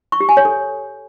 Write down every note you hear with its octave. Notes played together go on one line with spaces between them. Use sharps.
C#6
G4
G#5
C#5
A4